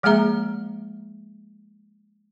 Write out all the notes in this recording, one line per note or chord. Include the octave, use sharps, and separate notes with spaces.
F3 G#3 A#3 G#4 E5 A#5